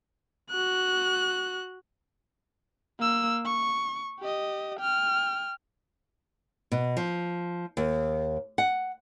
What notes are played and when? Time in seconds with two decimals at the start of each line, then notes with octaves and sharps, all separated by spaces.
0.51 F#4 F#6
2.99 A#3 E6
3.45 C#6
4.20 G4 D#5
4.79 G5 F6
6.72 B2
6.97 F3
7.77 D#2
8.58 F#5